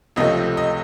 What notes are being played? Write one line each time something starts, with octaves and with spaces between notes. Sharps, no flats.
C#2 C3 F3 A3 D#5
D#5